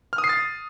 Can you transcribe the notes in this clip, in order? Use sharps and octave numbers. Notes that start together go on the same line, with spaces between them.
F6
D#6
C7
A6